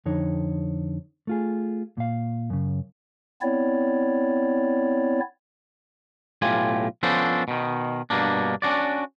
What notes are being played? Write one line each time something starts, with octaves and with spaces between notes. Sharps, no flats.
F2 D3 D#4 C#5
A3 F4 G#4
A#2 F5
F#2 C#3
B3 C4 E4 C#5 D5
B1 A2 F4 G4 G#5
F3 B3 C#4 D4 A4 C5
B2 D#3
G2 B2 A#3 D4
C#4 D4 F#4 D5